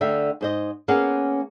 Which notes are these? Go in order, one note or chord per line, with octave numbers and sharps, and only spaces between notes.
D2 D3 E5 F5 G5
G#2 C5 D#5
A#3 B3 C#4 G#4 F5 F#5